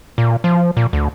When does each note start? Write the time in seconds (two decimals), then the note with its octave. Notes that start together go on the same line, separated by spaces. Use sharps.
0.18 A#2
0.44 F3
0.77 A#2
0.93 D2